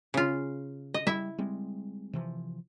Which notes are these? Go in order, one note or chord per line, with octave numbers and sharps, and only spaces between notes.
C#3 F4
D#5
G3 E4 E5
G3 G#3 C4
C3 E3 F3